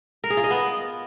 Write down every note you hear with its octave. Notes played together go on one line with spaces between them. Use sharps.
A#4
G#4
F4
D#5
B3